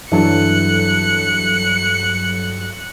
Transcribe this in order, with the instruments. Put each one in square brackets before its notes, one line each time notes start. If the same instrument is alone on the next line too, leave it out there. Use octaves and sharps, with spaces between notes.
[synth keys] G2 F#3 A4 [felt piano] E3 D4 [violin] F#6 C#7